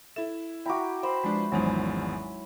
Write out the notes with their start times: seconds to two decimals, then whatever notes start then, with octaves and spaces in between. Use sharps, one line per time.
0.16 E4 A4 E5 E7
0.66 E4 F#4 G5 A#5 D6
1.03 C5 B5 E6
1.24 F3 G#3 D4 B4
1.52 G#1 E2 F3 F#3 G#3 C#4 D#4